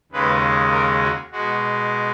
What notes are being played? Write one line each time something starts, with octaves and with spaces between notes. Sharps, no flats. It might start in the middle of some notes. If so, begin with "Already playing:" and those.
D#2 C#3 G#3 B4
A#4
F#4
B2 G#3 F#4